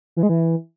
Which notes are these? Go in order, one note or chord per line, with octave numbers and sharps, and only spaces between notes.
E3
G#3
E3